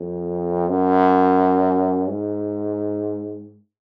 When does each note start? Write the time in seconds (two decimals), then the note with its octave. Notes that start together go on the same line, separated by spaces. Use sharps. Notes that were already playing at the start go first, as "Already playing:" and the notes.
Already playing: F2
0.69 F#2
2.10 G#2